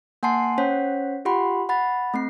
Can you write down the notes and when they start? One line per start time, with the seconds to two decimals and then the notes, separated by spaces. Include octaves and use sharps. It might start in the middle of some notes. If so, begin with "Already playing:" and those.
0.23 A#3 F#5 G#5 A5 C6 C7
0.58 C#4 C5 C#5 F#5 B6
1.25 F4 G4 F#5 B5 C6
1.69 F#5 B5 A6
2.14 A3 C4 C7